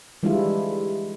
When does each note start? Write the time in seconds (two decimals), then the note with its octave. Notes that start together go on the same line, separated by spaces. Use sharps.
0.23 E3 G3 G#3 D4 E4 F4